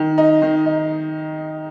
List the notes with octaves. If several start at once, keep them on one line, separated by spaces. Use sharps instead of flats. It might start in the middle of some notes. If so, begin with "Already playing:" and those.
Already playing: D#3
D#4
D#3
D#4